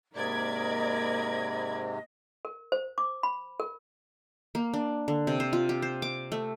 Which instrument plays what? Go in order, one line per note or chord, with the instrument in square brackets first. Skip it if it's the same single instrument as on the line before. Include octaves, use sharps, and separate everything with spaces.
[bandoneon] G#2 C3 [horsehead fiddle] A#3 A#4 [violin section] D5 B5 G#6 [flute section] D#5
[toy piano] A#4
C5
D6
B5
A#4
[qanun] A#3
D4
D3
C3
C5
F4
G4
C5
D6
A3